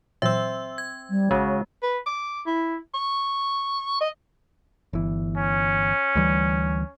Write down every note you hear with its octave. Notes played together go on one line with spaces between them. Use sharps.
A#2 E3 F#3 C4 C5 E5 E6
G#6
G3
A#1 C#3 G#3 F#4 C#5 D6
B4
D6
E4
C#6
D#5
G1 E3
C#4
D2 E3 G3